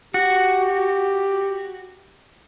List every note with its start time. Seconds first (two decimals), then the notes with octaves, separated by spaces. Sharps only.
0.14 F#4 G4